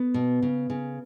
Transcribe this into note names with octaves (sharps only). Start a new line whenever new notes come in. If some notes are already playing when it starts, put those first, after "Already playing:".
Already playing: B3
B2
C#3
C#3